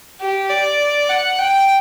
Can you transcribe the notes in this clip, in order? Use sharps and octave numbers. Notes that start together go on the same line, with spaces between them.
G4
D5
F#5
G5